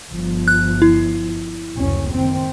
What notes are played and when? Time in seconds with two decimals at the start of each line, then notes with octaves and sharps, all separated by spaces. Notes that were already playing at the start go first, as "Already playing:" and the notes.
0.11 G1 F3
0.48 F#6
0.82 E4
1.76 F#1 D2 C#4
2.11 D#3 C4